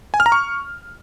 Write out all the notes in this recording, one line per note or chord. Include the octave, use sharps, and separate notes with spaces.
G#5
F6
A#5
C#6